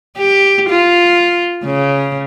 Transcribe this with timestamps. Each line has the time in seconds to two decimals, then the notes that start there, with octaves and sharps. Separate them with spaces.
0.18 G4
0.70 F4
1.64 C#3